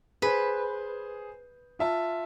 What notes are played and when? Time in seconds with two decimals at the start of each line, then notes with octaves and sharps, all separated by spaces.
0.22 G#4 B4 C5
1.79 F4 E5 A5